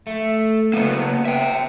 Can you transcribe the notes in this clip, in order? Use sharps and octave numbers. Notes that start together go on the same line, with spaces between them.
A3
C#3 A#3 B3
E5 G5